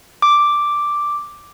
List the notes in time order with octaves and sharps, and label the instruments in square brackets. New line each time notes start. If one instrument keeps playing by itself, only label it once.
[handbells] D6